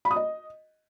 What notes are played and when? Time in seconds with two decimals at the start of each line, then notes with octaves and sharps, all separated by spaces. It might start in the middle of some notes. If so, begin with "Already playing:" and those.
0.05 B5
0.11 D#6
0.16 D#5